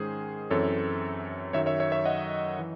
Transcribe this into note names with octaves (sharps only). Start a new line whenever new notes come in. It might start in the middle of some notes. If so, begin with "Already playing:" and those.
Already playing: G#2 D#3 G#3 C#4 G#4 C5
F#2 E3 C4 A4 C#5
F#2 D#3 F#3 C#5 E5
C#5 E5
C#5 E5
C#5 E5
D#5 F#5
E3